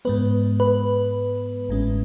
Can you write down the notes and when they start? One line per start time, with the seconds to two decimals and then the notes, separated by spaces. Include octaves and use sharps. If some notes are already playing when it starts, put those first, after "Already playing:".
0.05 G#2 G#3 B3 B4
0.60 B4
1.69 A1 A2 G#3 C#4